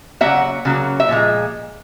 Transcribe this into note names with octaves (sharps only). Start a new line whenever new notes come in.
C#3 F#3 A#3 E5 F#5
C#3 F#3 A#3
E5
A#2 F3 G#3